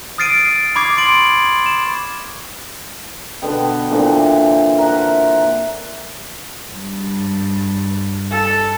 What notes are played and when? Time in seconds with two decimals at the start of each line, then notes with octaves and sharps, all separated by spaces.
0.18 D#6 F6 A6 C7 D7 D#7
0.76 B5 C#6 D6 G#6 C7
0.97 C6 C#6 A6 D7 F#7
1.66 E7
3.42 B2 D3 B3 G5
3.91 A#2 D3 E3 C4
4.78 A#4 E5 F#5
6.71 G2
8.32 A4